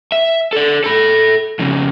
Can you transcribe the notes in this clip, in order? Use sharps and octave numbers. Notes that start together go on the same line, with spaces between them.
E5
A4 D5
A4 B5
F2 C#3